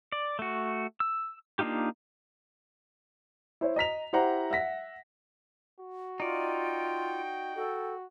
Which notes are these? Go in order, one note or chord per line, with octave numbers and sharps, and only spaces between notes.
D5
A3 F#4
E6
A#3 D4 D#4 F4 G4
E4 C5 C#5
D#5 A#5 B6 F7
E4 G4 C5 F#5 A#5
E5 F#5 A#6 B6
F#4
D#4 F4 D5 G5
F#4 A4